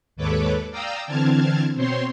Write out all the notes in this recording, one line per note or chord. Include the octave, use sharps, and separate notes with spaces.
D#2 G#2 A4 B4 C#5 D6
D5 F5 G5 A#5 D#6 E6
D3 E3 C4 A5 F6 G#6
B2 C4 C5 C#5 C6